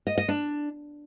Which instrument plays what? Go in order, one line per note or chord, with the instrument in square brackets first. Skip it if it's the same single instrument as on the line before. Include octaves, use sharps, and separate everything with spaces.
[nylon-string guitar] D#5
D#5
D4